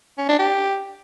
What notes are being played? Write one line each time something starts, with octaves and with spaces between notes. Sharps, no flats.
C#4
D4
G4